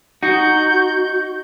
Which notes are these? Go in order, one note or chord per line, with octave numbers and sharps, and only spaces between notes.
D#4 F#4 G6